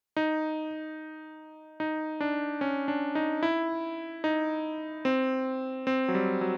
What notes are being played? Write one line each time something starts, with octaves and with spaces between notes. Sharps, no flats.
D#4
D#4
D4
C#4
D4
D#4
E4
D#4
C4
C4
F#3
G3
F#3